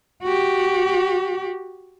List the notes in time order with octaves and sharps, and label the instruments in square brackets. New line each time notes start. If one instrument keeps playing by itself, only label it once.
[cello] F#4 G4